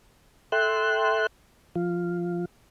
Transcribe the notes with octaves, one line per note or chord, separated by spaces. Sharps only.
A4 E5 G5 C6 F#6
F3 F4